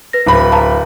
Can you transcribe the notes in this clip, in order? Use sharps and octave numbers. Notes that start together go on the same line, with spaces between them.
B4 A#6
D1 B5
F5 A5 A#5